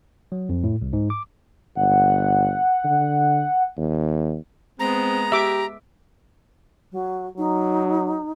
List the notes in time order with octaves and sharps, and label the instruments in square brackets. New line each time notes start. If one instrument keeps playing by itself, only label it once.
[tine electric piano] F#3
F2
A2
C2
G#2
D6
[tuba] G1 [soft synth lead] F#5
[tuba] D3
D#2
[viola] G#3 B3 [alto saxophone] C4 [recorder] A#5
[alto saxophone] G4 [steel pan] E5 D6
[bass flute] F#3
[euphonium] F#3 [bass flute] D#4